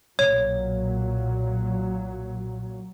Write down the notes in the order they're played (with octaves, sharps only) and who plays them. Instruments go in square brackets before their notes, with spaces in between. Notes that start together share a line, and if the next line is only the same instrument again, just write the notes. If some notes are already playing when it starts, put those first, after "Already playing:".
[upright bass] B1 [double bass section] A#2 F#3 [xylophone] C#5